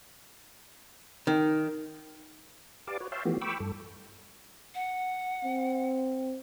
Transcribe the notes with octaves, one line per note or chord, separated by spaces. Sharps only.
D#3
G4 B4 D5 F5 A5 D6
F#4 B4 C#5
C#5 E5 F5 G5 A5 C6
E3 F3 A3 B3 F#4 G4
G5 B5 C#6 D6 E6
G2 A4
F#5
C4